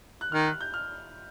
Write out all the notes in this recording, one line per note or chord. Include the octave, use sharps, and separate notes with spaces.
F#6
D#3 F6
F#6
G6
F6